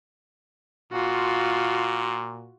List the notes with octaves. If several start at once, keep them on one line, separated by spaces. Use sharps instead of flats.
A#2 F4 F#4